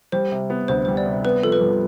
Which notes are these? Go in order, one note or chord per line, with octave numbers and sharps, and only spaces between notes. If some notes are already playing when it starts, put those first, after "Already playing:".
G3 C5
C3
B3
D2 C5
G3 C5
D5
C3
B3 B4
F3 A4
B4
G2